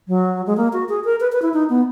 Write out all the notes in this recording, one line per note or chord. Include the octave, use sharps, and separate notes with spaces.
F#3
G#3
A#3
F#4
G#4
A#4
B4
B4
E4
D#4
B3